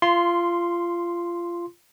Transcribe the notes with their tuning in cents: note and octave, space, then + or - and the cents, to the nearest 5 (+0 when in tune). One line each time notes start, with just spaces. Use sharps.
F4 -20 C6 +0